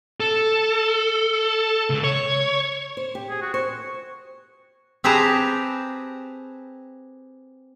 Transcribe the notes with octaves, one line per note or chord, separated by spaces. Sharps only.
A4
C#2
C#5
C5
G4
G#4
F#4
C5 C#6
C4 G4 G#4 B4 A5 A#5